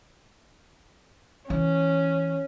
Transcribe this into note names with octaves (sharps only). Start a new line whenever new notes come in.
E3 C#4